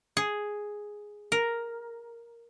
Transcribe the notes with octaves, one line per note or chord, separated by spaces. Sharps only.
G#4
A#4